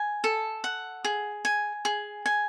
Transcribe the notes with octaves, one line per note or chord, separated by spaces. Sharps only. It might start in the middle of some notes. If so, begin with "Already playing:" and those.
Already playing: G#5
A4
F#5
G#4
G#5
G#4
G#5